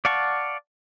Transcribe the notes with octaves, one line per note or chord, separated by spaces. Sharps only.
D5 F5 F#5 A5 C#6